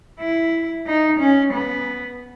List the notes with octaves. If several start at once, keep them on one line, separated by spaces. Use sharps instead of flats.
E4
D#4
C#4
B3